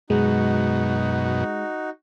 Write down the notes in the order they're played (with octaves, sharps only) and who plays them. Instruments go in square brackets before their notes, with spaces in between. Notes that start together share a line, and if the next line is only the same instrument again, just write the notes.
[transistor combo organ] F#2 B2 [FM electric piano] G#3 [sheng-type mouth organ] D#4 F#4